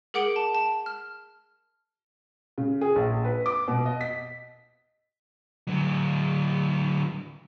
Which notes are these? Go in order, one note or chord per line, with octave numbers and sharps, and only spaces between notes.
G#4 A#4 F#5 D6 D7 F#7
A5
A5
F6
C#3
G#4
A#1
B4
D6
B2
D#5
B6
D3 F#3